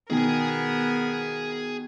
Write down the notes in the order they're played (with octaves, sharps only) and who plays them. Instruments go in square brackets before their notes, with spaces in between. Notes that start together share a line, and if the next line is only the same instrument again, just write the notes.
[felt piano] B2 D#3 [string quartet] B3 A#4 [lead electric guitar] G#4 G#5